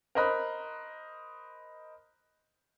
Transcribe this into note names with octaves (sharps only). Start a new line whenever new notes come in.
A#4 C5 D#5 B5 F#6